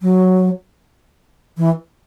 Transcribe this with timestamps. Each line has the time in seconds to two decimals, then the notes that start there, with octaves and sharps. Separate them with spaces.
0.02 F#3
1.57 E3